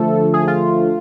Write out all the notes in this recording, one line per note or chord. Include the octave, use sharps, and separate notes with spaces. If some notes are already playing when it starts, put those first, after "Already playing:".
Already playing: D3 F3 A3 A4
G#4
F4